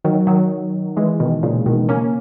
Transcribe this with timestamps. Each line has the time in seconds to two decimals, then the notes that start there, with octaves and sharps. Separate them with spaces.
0.04 D#3 F#3
0.27 D#3 F#3
0.97 E3 G#3
1.20 B2 D#3
1.43 A#2 C#3
1.66 B2 D#3
1.89 A#3 C#4